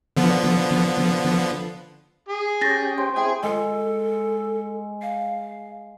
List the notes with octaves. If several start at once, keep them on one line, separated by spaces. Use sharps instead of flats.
D3 F3 B3
G#4
C#4 G4 A4 C#5 G5 A6 A#6
C5 G#5
C4 E4 G#4 G5 G#5
G#3 A4
F5